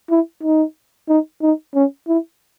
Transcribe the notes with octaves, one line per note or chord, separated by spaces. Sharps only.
E4
D#4
D#4
D#4
C#4
E4